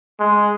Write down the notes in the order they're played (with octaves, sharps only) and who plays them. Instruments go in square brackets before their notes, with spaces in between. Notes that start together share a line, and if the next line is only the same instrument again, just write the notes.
[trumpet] G#3